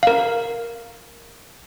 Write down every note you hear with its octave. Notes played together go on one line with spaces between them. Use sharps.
A#4 F5